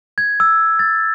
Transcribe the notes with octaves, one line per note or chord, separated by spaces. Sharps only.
G#6
E6
A6